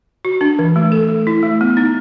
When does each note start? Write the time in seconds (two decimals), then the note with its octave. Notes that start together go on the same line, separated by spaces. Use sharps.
0.25 F#4
0.41 D4
0.59 E3
0.76 A3
0.92 A4
1.09 A3
1.27 E4
1.43 A3
1.61 B3
1.77 D#4